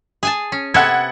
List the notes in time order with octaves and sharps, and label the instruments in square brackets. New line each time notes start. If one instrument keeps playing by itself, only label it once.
[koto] G#4 G#5 A5
C#4
[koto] C3 B3 A4 [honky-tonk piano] F#5 G#6